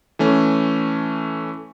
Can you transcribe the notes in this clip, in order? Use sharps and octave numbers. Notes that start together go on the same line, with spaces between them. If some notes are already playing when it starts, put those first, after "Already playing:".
E3 A3 C#4